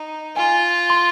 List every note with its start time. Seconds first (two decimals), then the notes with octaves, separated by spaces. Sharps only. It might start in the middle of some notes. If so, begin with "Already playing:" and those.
Already playing: D#4
0.36 F4 G#5
0.90 C6